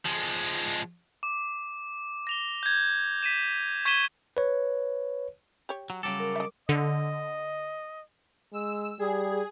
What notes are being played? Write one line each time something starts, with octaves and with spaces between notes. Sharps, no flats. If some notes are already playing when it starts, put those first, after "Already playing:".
F3 G#3
D6
A#6 F7 G7
G6 G#6
B6 D#7 E7
C#6 G#6 B6 D#7 E7 G7
B4 C#5
G4 C#5
F#3
C#3 F#3 G3 A4 D6
A#4
D#5 E5
D3 D#5
G#3 E6
G3 G#4